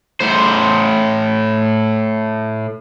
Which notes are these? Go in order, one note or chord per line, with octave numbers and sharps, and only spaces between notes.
A2 C5